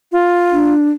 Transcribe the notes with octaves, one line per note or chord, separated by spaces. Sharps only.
F4
D4